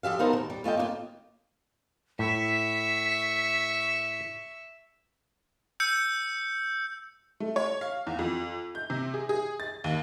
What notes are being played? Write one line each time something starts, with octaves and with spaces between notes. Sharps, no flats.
F3 G4 E5 F5
B3 D#4 A#4 C5 A5 A#5
D#2 E3
G3
A3 F4 D#5 G5
A#3 D4 F4
A2 E5 C#6 B6
E6 G6 C#7
A3
C#5
F5
E2
F2
G6
C3
G#4
G#4
A6
D#2